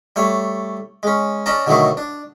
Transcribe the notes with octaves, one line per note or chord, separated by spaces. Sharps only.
G3 A3 C#5
G#3 C#4
C#4 D5 D#5 A5 A#5
B2 D3 D#3 F#3 A3 D#4
D4